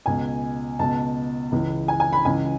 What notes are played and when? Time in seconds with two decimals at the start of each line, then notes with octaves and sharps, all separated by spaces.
0.06 C#2 B2 G#5
0.79 C#2 B2 A5
1.52 C#2 C#3 E3
1.88 G#5
2.00 G#5
2.13 B5
2.25 C#2 C#3 E3 G#5